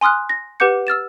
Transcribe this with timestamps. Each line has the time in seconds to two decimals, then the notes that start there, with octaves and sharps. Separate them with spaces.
0.01 G#5 C6 D#6 F6 F#6
0.29 A#6
0.60 G4 B4 F#5 D6 G6 C#7
0.87 E6 F6 A6 E7